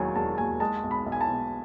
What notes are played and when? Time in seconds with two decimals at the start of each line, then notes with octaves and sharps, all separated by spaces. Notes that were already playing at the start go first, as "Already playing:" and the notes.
Already playing: E1 D#2 D#3 F#3 G#5
0.15 E1 A5
0.38 D#2 G#5
0.60 G#3 A5
0.83 B1
0.91 B5
1.06 B1
1.12 G#5
1.21 A5
1.28 B2